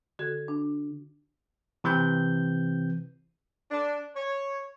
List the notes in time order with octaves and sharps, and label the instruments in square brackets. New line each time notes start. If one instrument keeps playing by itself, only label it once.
[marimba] D3 F#4 A4 G#6
D4
[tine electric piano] C3 E3 C4 G6
[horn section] D4
C#5